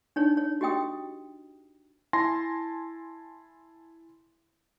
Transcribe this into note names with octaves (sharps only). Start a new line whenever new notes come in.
D4 D#4 C#5
C#5
F#4 G4 D#5 G5 D#6
E4 G#5 A5 C6 A#6